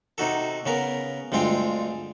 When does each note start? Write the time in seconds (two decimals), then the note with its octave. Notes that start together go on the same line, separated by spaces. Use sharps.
0.18 C3 D#4 F#4 A4
0.66 C#3 B3 A#4
1.32 D2 G2 G#3 C4 F4 G5